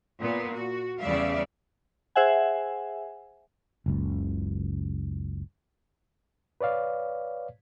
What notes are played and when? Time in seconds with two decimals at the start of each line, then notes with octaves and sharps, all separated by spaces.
0.20 A#2 B3
0.53 F#4
0.99 E2 C#3 G3 D5 E5 F5
2.16 G#4 C5 E5 F#5 G#5
3.86 F#1 C#2
6.61 B4 C#5 D5 F5